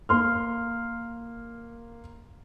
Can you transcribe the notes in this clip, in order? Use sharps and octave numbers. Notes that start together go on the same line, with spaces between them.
A#3 C6 F6